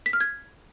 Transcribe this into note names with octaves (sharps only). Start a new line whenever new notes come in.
B6
F6
G#6